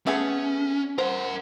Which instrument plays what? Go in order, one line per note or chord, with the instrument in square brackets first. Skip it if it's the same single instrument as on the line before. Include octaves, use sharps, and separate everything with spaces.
[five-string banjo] A3 B3 G#4 [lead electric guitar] C#4
[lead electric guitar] A#4 F#5 [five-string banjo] C5